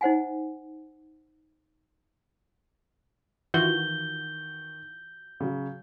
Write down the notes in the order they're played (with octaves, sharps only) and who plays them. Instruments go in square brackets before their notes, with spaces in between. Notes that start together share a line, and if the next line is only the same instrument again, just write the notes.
[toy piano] D#4 C5 F#5 G#5
[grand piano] D#3 [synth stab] E3 F4 F#4 [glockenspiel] G6 G7
[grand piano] C#3 F#3